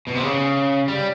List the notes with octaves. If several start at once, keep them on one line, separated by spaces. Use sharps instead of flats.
B2
C3
C#3
G3